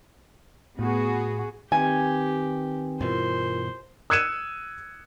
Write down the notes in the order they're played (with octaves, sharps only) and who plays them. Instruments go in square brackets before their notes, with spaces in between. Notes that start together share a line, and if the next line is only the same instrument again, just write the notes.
[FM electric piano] A2 [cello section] B3 F#4 G#4
[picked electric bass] D#3 [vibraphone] C4 B4 G5 [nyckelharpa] G4 [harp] G#5
[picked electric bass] G2 B2 E3 [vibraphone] E4 F4 A#4 [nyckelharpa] C5
[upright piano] E6 F#6 G#6 C#7 D#7 E7